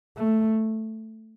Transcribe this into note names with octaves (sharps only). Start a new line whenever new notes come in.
A3